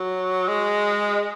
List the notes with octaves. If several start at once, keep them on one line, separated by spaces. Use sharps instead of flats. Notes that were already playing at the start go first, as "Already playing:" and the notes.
Already playing: F#3
G#3